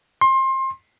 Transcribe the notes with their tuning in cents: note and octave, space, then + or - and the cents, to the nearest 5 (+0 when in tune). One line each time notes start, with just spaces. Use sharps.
C6 +25